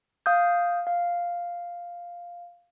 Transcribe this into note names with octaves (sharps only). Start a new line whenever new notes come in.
F5 D#6 G6
F5